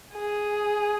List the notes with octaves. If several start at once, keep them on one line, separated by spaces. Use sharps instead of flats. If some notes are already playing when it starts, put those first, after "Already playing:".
G#4